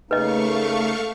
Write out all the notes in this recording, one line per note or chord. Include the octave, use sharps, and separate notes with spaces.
C#3 A3 A#3 D#4 B4 D#5 F5 C#6